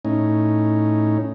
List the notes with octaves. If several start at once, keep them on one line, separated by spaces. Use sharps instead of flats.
A2 C#4 D#4